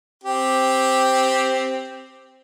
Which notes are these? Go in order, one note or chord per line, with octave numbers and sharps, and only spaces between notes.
C4 G4